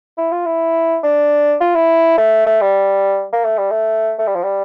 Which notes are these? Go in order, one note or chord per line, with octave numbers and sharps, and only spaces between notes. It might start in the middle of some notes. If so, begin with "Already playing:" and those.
E4
F4
E4
D4
F4
E4
A3
A3
G3
A#3
A3
G3
A3
A3
G3
F3
G3